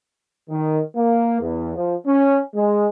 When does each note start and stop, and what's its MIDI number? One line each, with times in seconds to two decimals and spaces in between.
0.50 0.80 51
0.96 1.38 58
1.41 1.74 40
1.75 1.94 53
2.06 2.38 61
2.55 2.87 56